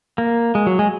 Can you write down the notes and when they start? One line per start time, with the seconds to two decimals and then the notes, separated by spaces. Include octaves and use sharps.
0.18 A#3
0.55 G#3
0.67 F#3
0.79 G#3